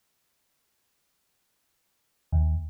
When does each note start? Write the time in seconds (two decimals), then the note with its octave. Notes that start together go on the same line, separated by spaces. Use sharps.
2.32 D#2